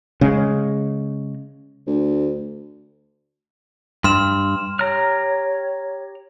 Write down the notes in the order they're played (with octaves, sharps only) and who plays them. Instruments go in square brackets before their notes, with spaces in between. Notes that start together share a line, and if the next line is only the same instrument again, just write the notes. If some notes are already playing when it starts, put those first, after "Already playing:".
[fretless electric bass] C#3 G#3
[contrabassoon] D2
[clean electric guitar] G2 [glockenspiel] C6 F6 E7
[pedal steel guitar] G4 A#5 F6 [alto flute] C#5